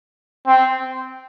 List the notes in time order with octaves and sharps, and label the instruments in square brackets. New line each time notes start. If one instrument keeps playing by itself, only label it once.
[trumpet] C4